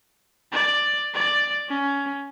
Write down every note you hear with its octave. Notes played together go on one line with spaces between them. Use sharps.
D5
D5
C#4